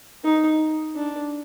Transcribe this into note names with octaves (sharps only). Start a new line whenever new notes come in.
D#4
D4